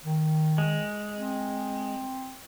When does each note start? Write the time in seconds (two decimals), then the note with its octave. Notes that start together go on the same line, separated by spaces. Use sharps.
0.05 D#3
0.58 G#3
1.17 C4